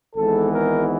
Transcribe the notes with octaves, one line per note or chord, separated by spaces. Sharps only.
G#1 G#2 E3 G#3 B3 A4
A#4